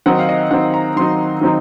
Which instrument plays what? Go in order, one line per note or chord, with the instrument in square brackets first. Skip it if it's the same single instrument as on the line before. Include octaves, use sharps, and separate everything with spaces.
[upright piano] D#3 F#3 C4 D#4 F#5
F5
D#5
D#3 F#3 C4 D#4 F#5
A#5
D#3 F#3 C4 D#4 C6
D#3 F#3 C4 D#4